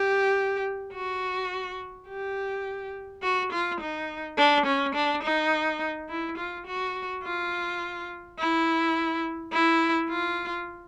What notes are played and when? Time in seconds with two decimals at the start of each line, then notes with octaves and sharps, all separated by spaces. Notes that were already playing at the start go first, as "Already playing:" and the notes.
Already playing: G4
0.93 F#4
2.08 G4
3.23 F#4
3.52 F4
3.80 D#4
4.38 D4
4.66 C#4
4.94 D4
5.23 D#4
6.09 E4
6.38 F4
6.66 F#4
7.24 F4
8.38 E4
9.53 E4
10.10 F4